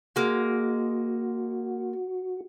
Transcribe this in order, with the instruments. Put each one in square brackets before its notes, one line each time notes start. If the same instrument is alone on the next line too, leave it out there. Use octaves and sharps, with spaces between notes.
[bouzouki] G#3 A#3 [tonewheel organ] F#4